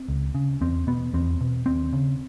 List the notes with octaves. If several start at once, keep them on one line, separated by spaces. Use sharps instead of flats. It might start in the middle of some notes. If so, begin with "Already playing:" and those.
Already playing: C4
C#2
C#3
E2 C4
B2 B3
E2 C4
B2
D#2 C4
C#3